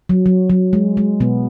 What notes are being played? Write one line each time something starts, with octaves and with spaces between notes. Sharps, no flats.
F#3
F#3
F#3
G#3
G#3
B2 B3